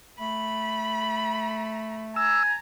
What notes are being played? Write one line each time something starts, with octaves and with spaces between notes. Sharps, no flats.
A3 B5
G#5 A#5 E6